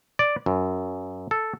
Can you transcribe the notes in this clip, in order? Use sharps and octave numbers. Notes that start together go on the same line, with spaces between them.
D5
F#2
A4